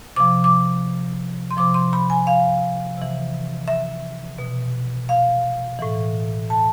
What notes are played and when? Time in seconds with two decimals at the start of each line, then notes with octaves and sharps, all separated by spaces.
0.16 C3 F3 D6
0.44 D6
1.51 C6
1.57 C3 F3 D6
1.74 C6
1.93 B5
2.10 G#5
2.27 F5
2.98 C3 E3
3.68 E5
4.39 B2
5.09 F5
5.79 A2 E3
6.50 A5